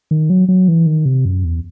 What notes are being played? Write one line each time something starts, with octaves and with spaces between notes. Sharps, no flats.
D#3
F#3
F#3
E3
D#3
C3
F#2
E2